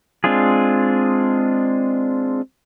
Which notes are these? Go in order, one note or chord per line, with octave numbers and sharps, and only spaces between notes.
G#3 C4 D4 F4 G#4